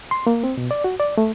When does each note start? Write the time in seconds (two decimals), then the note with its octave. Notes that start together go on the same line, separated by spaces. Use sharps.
0.11 C6
0.27 A#3
0.44 C4
0.58 B2
0.71 D5
0.84 F#4
1.00 D5
1.18 A3